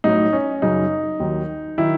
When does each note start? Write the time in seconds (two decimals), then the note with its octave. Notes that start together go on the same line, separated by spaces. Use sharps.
0.04 A2 F#3 D#4
0.33 C#4
0.62 F#2 C#3 F#3 D#4
1.20 D#2 D#3 F#3
1.78 D#3 F#3 E4